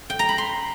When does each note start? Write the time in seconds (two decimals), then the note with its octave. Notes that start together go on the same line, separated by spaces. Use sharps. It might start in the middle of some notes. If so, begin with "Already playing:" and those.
0.10 G5
0.19 A#5
0.29 B5
0.38 C6